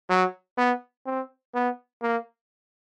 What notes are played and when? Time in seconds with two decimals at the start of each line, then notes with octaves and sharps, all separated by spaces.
0.09 F#3
0.58 B3
1.06 C4
1.54 B3
2.02 A#3